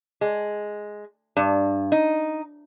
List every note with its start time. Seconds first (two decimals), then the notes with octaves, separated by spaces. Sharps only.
0.21 G#3
1.37 G2
1.92 D#4